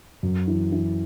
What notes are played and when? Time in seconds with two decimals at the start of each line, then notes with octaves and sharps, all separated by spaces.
0.23 F#2
0.48 E3
0.72 E3